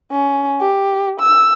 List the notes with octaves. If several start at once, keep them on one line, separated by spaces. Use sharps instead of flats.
C#4
G4
E6